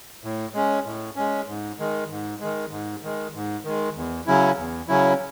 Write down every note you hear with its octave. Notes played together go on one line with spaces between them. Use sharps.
A2
G#3 C#4
A2
G#3 C#4
G#2
D#3 G#3
G#2
D#3 G#3
G#2
D#3 G#3
G#2
D#3 G#3
E2
C#3 F#3 C#4 E4
E2
C#3 F#3 C#4 E4